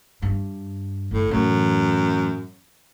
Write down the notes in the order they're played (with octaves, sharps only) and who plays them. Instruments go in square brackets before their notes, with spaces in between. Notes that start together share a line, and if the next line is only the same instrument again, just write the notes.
[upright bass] G2
[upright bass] G1 [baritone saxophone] A2
[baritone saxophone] F#2 [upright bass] A2 E3